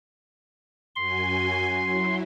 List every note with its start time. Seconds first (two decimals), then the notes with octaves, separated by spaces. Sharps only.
0.96 F#2 F#3 G#5 C6
1.86 F#3 E4